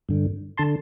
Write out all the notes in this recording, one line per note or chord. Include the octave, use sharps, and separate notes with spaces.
G2 D3
D3 A5 C6